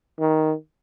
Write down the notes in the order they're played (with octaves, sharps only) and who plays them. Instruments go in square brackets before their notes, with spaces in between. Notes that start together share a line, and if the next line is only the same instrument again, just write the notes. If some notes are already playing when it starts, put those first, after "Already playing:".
[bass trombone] D#3